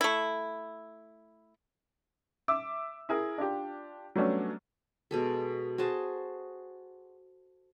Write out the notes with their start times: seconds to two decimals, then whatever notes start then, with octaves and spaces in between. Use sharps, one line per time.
0.01 A3 E4
2.48 E5 D6 E6
3.09 E4 G#4 A#4
3.38 D4 F4 G4
4.16 F#3 G3 A3 B3 C#4 D4
5.11 B2 G#3 A4
5.78 F#4 G#4 C5 A5